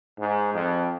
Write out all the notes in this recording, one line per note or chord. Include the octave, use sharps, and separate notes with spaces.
G#2
F2